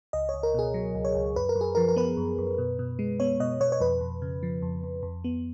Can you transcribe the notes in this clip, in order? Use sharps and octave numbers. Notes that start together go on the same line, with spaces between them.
C#2 D#5
C#5
C#2
A#4
B2 G#4
F#3
C#2
C#5
C#2
F#2 B4
A#4
F#2
G#4
F3 A#4
A#4
B3 B4
F#2
F#2
B2
B2
G#3
B3 C#5
B2 D#5
B2 C#5
C#5
F2 B4
F2
C#3
F3
F2
F2
F2
B3